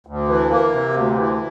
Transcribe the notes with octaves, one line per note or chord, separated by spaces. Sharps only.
D2
E3
A#3
C3
D2
E3